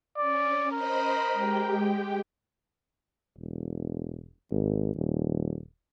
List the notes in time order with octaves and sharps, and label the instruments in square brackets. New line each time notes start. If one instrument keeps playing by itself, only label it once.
[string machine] C#4 [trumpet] D5
[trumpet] A#4 [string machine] C5 D#5 B5
[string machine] G#3 G4 G5
[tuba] E1
G#1
D#1